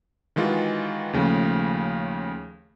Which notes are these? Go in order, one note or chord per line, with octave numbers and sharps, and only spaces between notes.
D#3 E3 G#3 F4 F#4
D#2 C#3 F3 A3